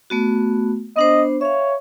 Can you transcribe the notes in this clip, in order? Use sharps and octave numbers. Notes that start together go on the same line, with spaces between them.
A3 B3 F#4
B3 D4 C5 D#5
C#5 E5 F5